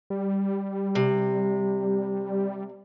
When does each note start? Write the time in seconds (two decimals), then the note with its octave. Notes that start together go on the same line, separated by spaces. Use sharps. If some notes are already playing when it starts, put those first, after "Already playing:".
0.10 G3
0.95 C3